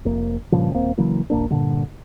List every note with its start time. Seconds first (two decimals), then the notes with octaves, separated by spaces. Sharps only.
0.05 F1 A#3
0.52 G2 A#2 C#3 F3
0.74 D#1 A#3 C4
0.98 C#3 E3 F#3 A#3
1.30 E1 A#1 A#3 D4
1.50 G2 A#2 D3 G3